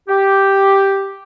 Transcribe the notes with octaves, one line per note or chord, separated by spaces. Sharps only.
G4